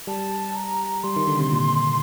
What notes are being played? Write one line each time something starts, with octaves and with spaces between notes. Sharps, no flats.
G3 A5
A#5
G3 C6
D#3
D3
C3
A#2